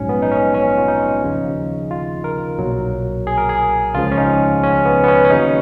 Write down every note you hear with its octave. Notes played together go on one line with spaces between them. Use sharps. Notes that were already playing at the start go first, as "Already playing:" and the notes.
Already playing: A#1 G#2 F#3 C#4
B3
D#4
C#4
C#4
F4
D#4
D#2 C#3 F3
F4
A#4
B1 A#2 F#3
G#4
A#4
G#4
C#2 C#3 F3 F4
C#4
D#4
C#4
B3
B3
C#4
C#4
D#2 C#3 F#3 D#4